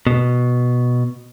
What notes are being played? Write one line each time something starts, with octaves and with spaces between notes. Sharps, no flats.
B2